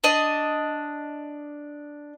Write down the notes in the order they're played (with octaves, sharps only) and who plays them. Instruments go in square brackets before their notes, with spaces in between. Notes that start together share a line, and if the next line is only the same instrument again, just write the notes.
[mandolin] D4 D#5